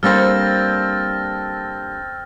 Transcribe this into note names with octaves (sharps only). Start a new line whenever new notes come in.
G3 A#3 C4 D4 A4 F6 A6 A#6